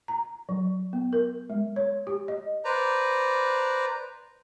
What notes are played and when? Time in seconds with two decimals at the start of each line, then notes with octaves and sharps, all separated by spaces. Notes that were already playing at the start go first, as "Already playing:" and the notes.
0.08 A#5
0.49 F#3
0.93 B3
1.13 A#4
1.50 G#3
1.76 C#5
2.07 G4
2.28 D#5
2.65 B4 C5 D5 A#5